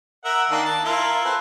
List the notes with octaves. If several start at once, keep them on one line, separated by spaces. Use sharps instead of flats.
A#4 E5 F#5
D#3 A#3 D4
A5
E4 F4 A#4
C4 A4 B4